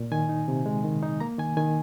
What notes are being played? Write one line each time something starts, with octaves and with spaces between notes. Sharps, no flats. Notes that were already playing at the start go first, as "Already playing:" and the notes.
Already playing: A#2
D#3 G#5
D#4
C3
G#3
D#3
D#4
A#3 A#5
D#3 G#5
D#3 G#5